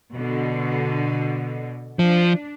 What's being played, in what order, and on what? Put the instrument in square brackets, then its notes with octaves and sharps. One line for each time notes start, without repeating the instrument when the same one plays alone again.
[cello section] B2 D3
[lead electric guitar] F3 [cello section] D4